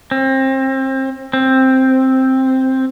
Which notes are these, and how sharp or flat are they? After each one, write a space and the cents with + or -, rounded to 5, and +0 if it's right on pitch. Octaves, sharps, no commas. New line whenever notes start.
C4 +30
C4 +5